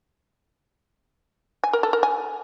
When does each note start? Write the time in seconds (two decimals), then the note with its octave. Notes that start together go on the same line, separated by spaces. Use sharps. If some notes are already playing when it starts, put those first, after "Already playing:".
1.64 G#5
1.73 A#4
1.83 A4
1.93 A#4
2.03 G#5